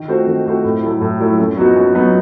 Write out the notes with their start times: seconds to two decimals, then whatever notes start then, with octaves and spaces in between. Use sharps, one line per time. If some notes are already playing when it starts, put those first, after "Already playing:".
Already playing: D#3
0.08 A3 C4 F#4 C5
0.27 D#3
0.46 A3 C4 F#4 C5
0.64 A2
0.83 F#3 A3 E4
1.01 A2
1.20 F#3 A3 E4
1.39 F#2
1.57 F#3 B3 D#4 F#4
1.76 F#2
1.95 F#3 B3 D#4 F#4